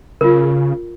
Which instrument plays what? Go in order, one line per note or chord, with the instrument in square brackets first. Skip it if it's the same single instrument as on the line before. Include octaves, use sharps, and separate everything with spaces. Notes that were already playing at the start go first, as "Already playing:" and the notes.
[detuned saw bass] C#3 [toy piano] F4 A#4